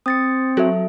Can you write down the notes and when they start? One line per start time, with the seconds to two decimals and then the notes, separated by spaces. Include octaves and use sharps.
0.06 C4 D#6 A6 C#7
0.57 F#3 A4 E5